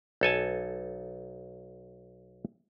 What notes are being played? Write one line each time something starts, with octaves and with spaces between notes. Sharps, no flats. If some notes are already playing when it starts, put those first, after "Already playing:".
B1 A4 G#5 A5